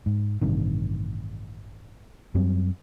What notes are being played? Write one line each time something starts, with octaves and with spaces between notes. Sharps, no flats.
G#2
A1 G2 C3 D#3
F#2 F#3 G3 C4